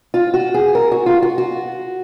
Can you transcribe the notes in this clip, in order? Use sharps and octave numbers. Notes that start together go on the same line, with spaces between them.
F4
F#4
G#4
A#4
F#4
F4
F#4
F#4